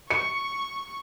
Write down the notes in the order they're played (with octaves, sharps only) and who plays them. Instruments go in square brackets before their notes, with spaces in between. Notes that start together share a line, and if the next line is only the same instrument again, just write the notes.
[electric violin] C#6 [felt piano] C#7